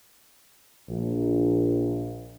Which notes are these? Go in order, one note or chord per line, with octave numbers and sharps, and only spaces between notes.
A#1